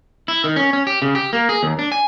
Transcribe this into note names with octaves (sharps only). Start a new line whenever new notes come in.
E4
D#3
C#4
C#4
G4
C#3
G4
A#3
G#4
D#2
D4
G#5